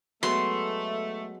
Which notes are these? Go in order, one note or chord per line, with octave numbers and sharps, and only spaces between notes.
F#3 G#3 A3 B3 C6